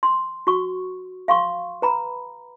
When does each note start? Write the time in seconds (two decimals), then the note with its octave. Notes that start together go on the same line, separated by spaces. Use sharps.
0.03 C6
0.47 F#4 C#6
1.28 F5 C6 C#6
1.82 B4 A#5 B5